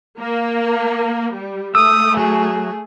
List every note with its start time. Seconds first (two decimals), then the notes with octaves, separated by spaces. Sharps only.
0.20 A#3
1.33 G3
1.75 A3 D#6 E6
2.17 F#3 F#4 G#4